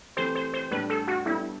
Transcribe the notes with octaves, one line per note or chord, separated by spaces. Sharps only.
E3 A3 C4 G4 C5
C5
C5
A2 G3 D4 B4
A4
F#4
G3 B3 D4 E4 A4 D5